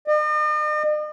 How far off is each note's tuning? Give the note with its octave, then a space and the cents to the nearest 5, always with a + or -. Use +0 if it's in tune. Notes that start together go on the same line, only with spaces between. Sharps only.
D#5 -45